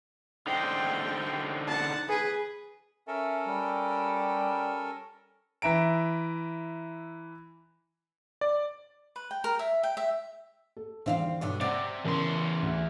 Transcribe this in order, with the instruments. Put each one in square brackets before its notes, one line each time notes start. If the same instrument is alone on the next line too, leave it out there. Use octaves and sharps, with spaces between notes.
[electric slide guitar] D3 D#4 C5 [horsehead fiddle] G5
[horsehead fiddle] F#5 A5
G#4 B4
[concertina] C#4 A4 A#4 [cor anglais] E5
[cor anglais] G3
[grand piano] E3 E5 A#5 D7
[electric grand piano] D5
[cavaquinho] B4
G5
A#4
E5
G5
E5
[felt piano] A4
[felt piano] E2 D3 D#3 [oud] C4 E5 F5
[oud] G2 B2 D3 [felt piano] C#5
[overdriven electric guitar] C3 [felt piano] C5 F#5 E6 [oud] D5
[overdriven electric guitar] E2 C6 [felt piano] C#3 A#4 A5
[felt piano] D2